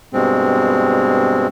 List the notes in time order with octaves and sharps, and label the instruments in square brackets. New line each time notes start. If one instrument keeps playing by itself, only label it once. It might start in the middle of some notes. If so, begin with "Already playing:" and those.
[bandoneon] G2 B2 G#3 C4